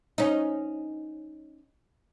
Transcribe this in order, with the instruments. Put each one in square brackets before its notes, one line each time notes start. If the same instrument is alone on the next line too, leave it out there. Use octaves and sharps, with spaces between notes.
[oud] C#4 D#4